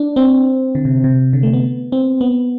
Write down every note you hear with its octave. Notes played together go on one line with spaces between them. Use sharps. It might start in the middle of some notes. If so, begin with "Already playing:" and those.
Already playing: D4
C4
D3
C3
C3
D3
A3
B3
C4
B3